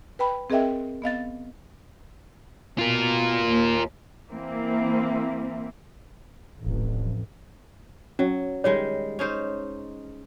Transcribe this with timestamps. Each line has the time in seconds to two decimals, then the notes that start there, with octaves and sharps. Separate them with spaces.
0.19 B4 G5 B5
0.50 C4 G#4 A#4 D#5 E5 G5
1.02 B3 D#5 F5 A6
2.79 B2 F4 A#4
3.48 D#2
4.28 E3 A#3 C4 E4
6.66 D1 A1 F2
8.19 F#3 C#4
8.64 D#3 G3 G#3 C#5
9.19 C#4 D#4 C5